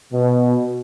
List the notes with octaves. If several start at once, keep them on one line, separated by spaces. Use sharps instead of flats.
B2